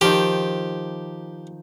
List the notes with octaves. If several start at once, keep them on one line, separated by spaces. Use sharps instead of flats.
D#3 F3 G4